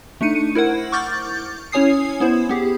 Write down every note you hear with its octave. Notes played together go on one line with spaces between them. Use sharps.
A3 D4 D#4 C#7 D#7
E4 A#4 C5 F#5
C#6 D6 F6 G6 A6
C#4 E4 C#5 G#5 D#6 C7
B3 E4 C5
B3 G4 G#4